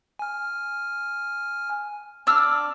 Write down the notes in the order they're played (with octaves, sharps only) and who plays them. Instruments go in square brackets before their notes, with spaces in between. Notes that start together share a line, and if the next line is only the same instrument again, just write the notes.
[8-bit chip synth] G#5 F6
[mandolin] D4 E6 F6 [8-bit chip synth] D6